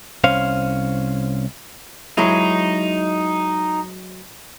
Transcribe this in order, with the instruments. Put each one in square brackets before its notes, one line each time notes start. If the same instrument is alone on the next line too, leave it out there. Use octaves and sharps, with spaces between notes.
[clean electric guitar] C2 C#4 C5 F5
[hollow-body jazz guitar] F#3 G#3 E4 [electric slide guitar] D#4